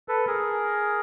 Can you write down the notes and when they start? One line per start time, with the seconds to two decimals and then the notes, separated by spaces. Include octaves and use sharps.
0.08 A4 B4
0.27 G#4 A#4